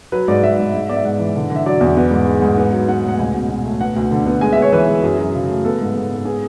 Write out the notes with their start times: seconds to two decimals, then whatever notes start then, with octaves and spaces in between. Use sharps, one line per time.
0.12 F#3 B4
0.28 G#2 D5
0.43 G#2 E5
0.59 G#2
0.74 G#2
0.89 B3 D5
0.97 E5
1.05 G#2 F#5
1.19 E3
1.36 D3
1.50 D3
1.56 E5
1.66 F#3 D5
1.81 E2
1.97 B3
2.11 G#2
2.27 G#3
2.42 G#2
2.57 B3
2.73 F#3
2.88 B3 F#5
3.04 A2 F#5
3.19 C#2 G#5
3.34 B2
3.50 B2
3.65 A3
3.81 B3 F#5
3.96 D2
4.11 D3
4.26 B3
4.41 G#3 G#5
4.53 E5
4.57 B3 C#5
4.72 E3 B4
4.87 G#3
5.03 F#2 G#4
5.18 F#3
5.34 C#3
5.48 A3
5.65 B3 A4
5.80 G#2
5.95 G#2
6.11 B3
6.25 B3 G#4